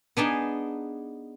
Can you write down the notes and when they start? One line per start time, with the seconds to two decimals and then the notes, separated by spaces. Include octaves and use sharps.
0.17 B3 D4 D#4 G#4